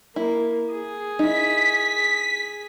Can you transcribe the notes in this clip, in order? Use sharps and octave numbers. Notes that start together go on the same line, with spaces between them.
A#3 E4
G#4
D#4 E4 B6